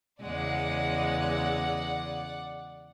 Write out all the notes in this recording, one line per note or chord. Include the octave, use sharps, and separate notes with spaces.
E2 C#3 G#3 D5 F#5